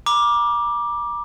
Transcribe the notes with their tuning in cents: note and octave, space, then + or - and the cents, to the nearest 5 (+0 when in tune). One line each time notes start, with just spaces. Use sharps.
A#5 +45 D6 +5